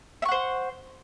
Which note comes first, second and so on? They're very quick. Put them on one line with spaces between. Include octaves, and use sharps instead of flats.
E5 C#6 F#5 C5